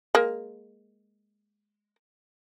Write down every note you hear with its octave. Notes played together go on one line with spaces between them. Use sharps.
G#3 A#3